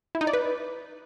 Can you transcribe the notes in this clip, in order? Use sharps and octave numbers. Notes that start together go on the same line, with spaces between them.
E4
D#4
D5
B4